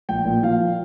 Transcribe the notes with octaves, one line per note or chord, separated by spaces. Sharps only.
A#1 G5
A#2
F3 F5